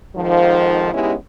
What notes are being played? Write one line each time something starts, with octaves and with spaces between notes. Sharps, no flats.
F2 G#2 D#3 F3
G#3 B3 C#4 D#4 E4 G4